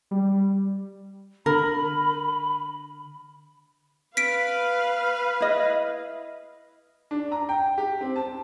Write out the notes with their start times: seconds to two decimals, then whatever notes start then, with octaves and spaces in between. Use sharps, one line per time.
0.11 G3
1.46 D3 A#4 B5
4.17 B4 F5 F6 B6 D7
5.41 E4 D#5
7.11 D4
7.32 A#5
7.49 G5
7.78 G4
8.01 C4
8.16 A5